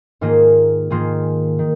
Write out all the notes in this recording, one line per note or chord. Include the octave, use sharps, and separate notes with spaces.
G#2 D#3 A#3 F4 G#4
G#2 D#3 A#3 F4 G#4
D#3